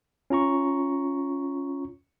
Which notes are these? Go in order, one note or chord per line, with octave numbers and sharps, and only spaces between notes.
C#4 F4 A#5 C#6